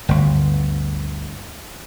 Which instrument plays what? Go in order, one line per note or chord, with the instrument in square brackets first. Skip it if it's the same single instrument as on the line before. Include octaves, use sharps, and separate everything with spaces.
[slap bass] G1 D2